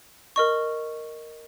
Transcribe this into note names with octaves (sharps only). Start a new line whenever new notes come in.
A#4 D#5 C#6